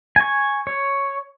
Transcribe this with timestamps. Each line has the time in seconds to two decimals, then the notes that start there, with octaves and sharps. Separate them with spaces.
0.16 G#5 C#6
0.67 C#5